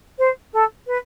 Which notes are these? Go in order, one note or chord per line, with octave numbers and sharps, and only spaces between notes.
C5
A4
B4